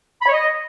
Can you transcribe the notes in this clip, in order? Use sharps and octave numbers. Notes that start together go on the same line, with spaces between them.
B5
C#5
D#5